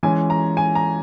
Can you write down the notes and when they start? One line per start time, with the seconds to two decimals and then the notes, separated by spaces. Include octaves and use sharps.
0.03 E3 G#3 C#4 G#5
0.30 A#5
0.57 G#5
0.75 A#5